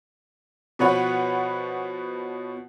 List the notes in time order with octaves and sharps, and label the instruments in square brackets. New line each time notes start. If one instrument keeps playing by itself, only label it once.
[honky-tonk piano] B2 F3 B4 C#5 F#5 B5